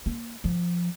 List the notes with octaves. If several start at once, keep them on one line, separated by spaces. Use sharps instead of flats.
A#3
F3